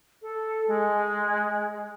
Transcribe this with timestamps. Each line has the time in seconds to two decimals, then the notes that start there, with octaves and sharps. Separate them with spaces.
0.22 A4
0.68 G#3